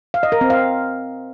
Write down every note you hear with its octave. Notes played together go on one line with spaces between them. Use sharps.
F5
D#5
A#4
C4
F5